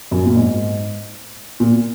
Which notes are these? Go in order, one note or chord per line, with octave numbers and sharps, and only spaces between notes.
F#2
A#2
G#2
A#2